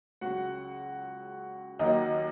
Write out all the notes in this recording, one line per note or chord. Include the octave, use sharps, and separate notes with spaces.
C#2 C#3 F#3 F#4 F#5
D#2 D#3 F#3 D#4 D#5